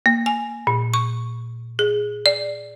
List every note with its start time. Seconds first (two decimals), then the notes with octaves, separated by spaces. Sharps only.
0.06 A#3
0.26 G#5
0.67 A#2
0.94 C#6
1.79 G#4
2.26 D5